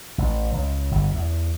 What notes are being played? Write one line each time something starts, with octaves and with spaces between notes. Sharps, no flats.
A1
C#2
G1
E2